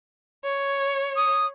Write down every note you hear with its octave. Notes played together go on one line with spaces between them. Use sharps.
C#5
D#6